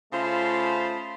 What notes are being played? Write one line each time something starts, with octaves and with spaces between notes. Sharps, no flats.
C#3 A3 F4 C5 A5 B5